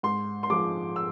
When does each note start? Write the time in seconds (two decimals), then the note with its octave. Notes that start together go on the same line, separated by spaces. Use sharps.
0.03 G#2 C6
0.43 C6
0.50 F3 G#3 D6
0.96 E6